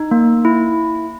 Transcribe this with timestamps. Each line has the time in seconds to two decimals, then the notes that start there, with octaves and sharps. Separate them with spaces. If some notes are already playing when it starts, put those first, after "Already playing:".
Already playing: D#4
0.11 A#3
0.45 E4